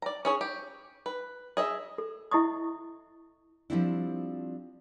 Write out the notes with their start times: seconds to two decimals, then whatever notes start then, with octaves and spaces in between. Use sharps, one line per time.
0.02 D5 A#5
0.25 C#4 G#4 C#5
0.41 G4
1.06 B4
1.57 G#4 D#5 E5
1.98 A4
2.31 E4 D#5 E5 C#6 D#6
3.70 F3 G3 A#3 C4 D4 E4